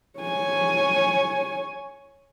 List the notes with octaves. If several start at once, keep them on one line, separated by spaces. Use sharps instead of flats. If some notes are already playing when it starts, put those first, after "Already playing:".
C#5 G#5